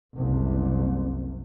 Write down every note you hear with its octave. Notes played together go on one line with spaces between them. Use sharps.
F#1 C2